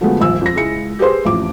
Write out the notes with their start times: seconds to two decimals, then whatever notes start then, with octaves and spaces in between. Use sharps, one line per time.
0.01 D3 F3 F#3 G#3 A3 B3
0.19 D#1 A#1 E6
0.41 F2 A#6
0.55 C#2 G#3 E4 C#7
0.99 G4 G#4 B4 C5 C6
1.25 A1 F2 D6